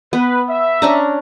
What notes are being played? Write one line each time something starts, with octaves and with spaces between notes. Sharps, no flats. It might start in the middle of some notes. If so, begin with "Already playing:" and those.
B3 B4
E5
C#4 D4 A#5